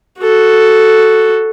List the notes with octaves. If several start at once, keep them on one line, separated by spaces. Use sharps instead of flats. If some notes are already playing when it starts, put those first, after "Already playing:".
F#4 A4